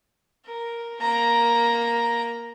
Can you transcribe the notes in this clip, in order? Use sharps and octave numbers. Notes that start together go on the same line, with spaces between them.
A#4
A#3 A#5